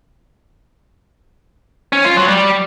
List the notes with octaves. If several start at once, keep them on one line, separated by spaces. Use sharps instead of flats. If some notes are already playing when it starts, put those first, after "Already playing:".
C#4
F4
F#3
G3